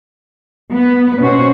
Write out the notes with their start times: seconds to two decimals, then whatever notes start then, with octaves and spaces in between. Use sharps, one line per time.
0.72 B3 B4
1.20 B2 C#4 F#4 C5